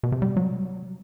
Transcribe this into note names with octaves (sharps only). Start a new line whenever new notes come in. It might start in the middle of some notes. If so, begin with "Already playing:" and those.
B2
C3
G3
F#3